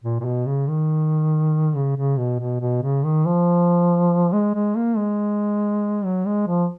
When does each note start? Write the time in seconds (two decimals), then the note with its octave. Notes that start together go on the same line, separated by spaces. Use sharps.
0.04 A#2
0.20 A#2
0.25 B2
0.46 C#3
0.68 D#3
1.75 C#3
1.97 C#3
2.18 B2
2.40 B2
2.61 B2
2.83 C#3
3.04 D#3
3.26 F3
4.33 G#3
4.55 G#3
4.76 A#3
4.97 G#3
6.05 F#3
6.26 G#3
6.47 F3